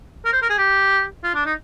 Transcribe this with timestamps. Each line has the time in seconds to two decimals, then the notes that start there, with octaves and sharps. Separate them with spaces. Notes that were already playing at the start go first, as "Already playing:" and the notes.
0.25 A#4
0.33 C5
0.42 A#4
0.49 G#4
0.58 G4
1.24 F4
1.34 D4
1.45 D#4